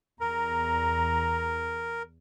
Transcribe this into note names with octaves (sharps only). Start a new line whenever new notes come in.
E2 A#4 A#5